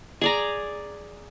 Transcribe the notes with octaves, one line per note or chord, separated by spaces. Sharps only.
G#4 D5 A#5